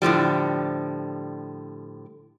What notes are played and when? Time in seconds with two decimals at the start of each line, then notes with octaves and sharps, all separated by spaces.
0.02 A2 D3 F3 G3